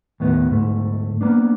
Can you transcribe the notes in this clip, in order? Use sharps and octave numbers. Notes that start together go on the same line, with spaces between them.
D#2 A2 B3
D2 G#2 A3
A#3 B3 D4